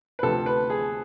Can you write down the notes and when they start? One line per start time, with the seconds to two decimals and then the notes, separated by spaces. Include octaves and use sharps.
0.19 B4
0.23 D2 C3 F3 A4
0.46 B4
0.70 G#4